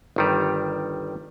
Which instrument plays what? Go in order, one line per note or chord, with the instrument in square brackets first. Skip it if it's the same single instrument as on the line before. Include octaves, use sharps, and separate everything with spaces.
[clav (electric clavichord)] G1 D#3 G3